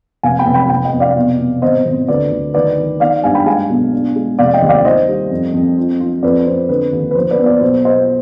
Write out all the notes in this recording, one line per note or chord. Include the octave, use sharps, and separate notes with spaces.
F1 F5 G#5
G5 B5
F1
G5 B5
F1 G5 B5
D#5 G5
F1
D5 F5
B2
B2
G#1 C5 D#5
G#1
D2 B4 D5
D2
D#3 B4 D5
D#3
D#3 D5 F5
G2 F5 G#5
G5 B5
G#3 F5 G#5
B1
D4
G#3
F1 D5 F5
D#5 G5
D#2
D5 F5
D#3 C5 D#5
G3
F2
F2
F4
F4
F2 B4 D5
F2 C5
D3 B4
D#2
B4
F3 C5
B4 D5
B3
B4 D5
B1 C5
B1 C5 D#5